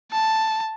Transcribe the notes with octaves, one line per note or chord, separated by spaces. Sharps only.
A5